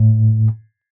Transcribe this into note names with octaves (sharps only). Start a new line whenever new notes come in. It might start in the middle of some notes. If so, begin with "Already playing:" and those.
Already playing: A2